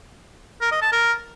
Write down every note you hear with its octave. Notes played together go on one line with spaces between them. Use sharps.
A#4
D#5
A5
A#4